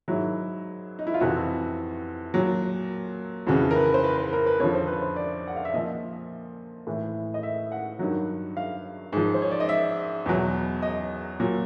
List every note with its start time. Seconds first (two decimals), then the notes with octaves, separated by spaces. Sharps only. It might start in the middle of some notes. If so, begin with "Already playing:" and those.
0.08 G#2 D#3 F#3 E4
0.99 D#4
1.07 E4
1.14 F4
1.20 F2 C3 E3 F#4
2.34 A#2 F#3
3.47 F2 C#3 E3 F#4
3.71 A#4
3.76 B4
3.94 C5
4.04 B4
4.18 B4
4.33 A#4
4.46 B4
4.60 F2 D3 F3 C#5
4.75 C5
4.87 B4
5.02 C5
5.16 D5
5.48 F#5
5.56 F5
5.65 E5
5.74 A#2 F3 D#5
6.87 A2 E3
7.34 D#5
7.43 E5
7.72 F#5
7.99 G2 D#3 F#3
8.57 F5
9.13 G#2 F3
9.34 C5
9.42 C#5
9.51 D5
9.60 D#5
9.69 E5
10.26 E2 B2 F#3
10.82 D#5
11.40 A#2 F#3